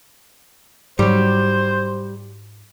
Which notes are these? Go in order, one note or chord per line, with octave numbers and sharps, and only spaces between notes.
G#2 F#3 G3 C5